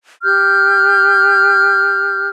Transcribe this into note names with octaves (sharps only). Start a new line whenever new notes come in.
G4 F6 G6